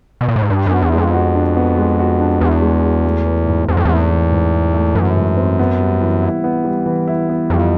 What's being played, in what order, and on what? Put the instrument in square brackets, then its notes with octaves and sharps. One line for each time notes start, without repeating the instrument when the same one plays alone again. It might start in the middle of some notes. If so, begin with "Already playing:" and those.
[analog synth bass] B2
A#2
A2
G#2
[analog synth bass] G2 [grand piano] D4
[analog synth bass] F#2 [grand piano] B3
[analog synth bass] E2
[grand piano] G#3
[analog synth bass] F2
[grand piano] F#4
D4
B3
G#3
F#4
D4
[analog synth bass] E2 [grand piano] B3
[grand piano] G#3
F#4
A3
E3
G#2
[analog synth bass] E2 [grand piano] C4
[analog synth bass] F2
[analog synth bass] E2 [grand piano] A3
[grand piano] E3
G#2
C4
A3
[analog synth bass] F#2 [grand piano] E3
[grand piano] G#2
C4
B3
G3
E3
E4
B3
G3
E3
E4
B3
[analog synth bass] F2 [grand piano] G3